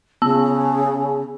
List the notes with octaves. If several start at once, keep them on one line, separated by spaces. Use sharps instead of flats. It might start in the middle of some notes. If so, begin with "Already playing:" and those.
C#3 B3 A5 E6